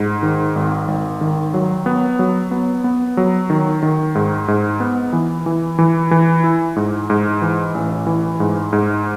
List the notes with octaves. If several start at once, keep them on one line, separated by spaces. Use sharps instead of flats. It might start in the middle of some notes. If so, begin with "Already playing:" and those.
Already playing: G#2
D#3
G#1
G#1
D#3
F#3
B3
F#3
B3
B3
F#3
D#3
D#3
G#2
G#2
B3
E3
E3
E3
E3
E4
G#2
G#2
E3
A1
E3
G#2
G#2